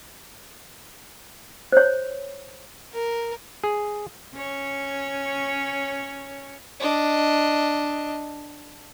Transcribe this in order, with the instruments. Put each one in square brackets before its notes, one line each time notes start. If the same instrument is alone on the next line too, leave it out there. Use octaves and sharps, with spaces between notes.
[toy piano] C5 C#5
[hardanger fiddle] A#4
[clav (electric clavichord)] G#4
[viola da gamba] C#4 C#5
[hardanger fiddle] D4 D#5